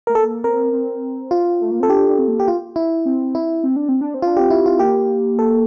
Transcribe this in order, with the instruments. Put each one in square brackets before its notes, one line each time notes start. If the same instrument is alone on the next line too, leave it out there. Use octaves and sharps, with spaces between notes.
[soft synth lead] A3 [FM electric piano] A#4
[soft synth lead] A#3 [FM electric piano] A4
[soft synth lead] C4 [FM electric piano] A#4
[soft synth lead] C4
[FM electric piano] F4
[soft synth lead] A3
A#3
[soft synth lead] C4 [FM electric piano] A4
[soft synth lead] D4 [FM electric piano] G4
[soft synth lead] D4
C4
A#3
[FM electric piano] G4
F4
E4
[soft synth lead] C4
[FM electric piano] E4
[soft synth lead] C4
D4
C4
D4
C4
[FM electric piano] F4
[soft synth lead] D4
[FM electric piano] G4
[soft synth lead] C4
[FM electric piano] E4
F4
[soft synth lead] A#3 [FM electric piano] G4
[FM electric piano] A4